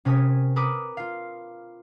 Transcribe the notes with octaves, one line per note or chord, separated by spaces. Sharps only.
C3 C#4 A#4 G#5 D#6 B6
A#4 B4 D6 D#6
F4 F5